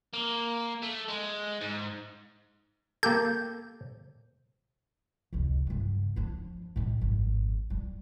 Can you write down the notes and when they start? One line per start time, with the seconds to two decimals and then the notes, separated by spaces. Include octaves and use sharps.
0.13 A#3
0.82 A3
1.08 G#3
1.61 G#2
3.03 A#3 G4 A4 G6
5.33 F1 C#2
5.67 G2 C#3
6.16 F3 D4
6.76 A2 G#3
7.01 G#1 F2
7.70 G3